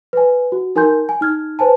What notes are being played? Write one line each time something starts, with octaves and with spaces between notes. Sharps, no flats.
B4 G#5
F#4
D#4 A#4 G#5 C6 G6
G#5
D#4 F6 G#6
B4 C5 G#5 A5